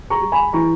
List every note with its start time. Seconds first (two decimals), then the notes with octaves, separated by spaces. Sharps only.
0.10 A#5 C#6
0.21 G3
0.32 G#5 B5
0.53 E3 A#5 C#6